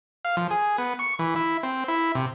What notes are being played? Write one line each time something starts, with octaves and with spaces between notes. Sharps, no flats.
F5
F3
G#4
B3
C#6
E3
E4
C4
E4
C3